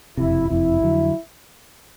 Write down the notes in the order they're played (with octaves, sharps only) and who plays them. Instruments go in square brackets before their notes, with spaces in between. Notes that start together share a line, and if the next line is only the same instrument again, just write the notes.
[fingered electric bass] F#1 F2 C3 [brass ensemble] E4
[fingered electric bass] F#1 F2 C3 [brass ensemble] E4
[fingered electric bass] F2 D3 F#3